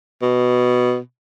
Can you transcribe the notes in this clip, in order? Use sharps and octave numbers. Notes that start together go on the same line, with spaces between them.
B2